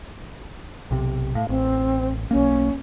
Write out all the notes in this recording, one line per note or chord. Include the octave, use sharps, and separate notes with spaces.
B1 C3
A2 F5
A1 C4
B1 A#3 C#4